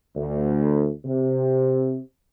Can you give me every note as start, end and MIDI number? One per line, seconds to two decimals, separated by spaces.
0.16 0.89 38
1.05 1.98 48